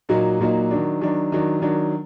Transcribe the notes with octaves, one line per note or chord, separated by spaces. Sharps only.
A#2 F#3 A#3 D#4 F#4
A#2 F#3 A#3 D#4 F#4
D#3 F#3 D4
D#3 F#3 D4
D#3 F#3 D4
D#3 F#3 D4